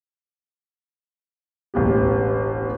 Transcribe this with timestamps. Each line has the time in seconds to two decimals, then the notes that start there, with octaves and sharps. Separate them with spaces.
1.74 E1 A1 B3 G4